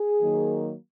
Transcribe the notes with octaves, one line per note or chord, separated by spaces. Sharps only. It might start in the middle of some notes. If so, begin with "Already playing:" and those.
Already playing: G#4
D#3 F#3 A#3